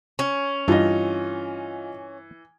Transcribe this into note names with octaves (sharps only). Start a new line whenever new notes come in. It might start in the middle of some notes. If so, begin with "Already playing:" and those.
C#4
G2 E3 F4 D#5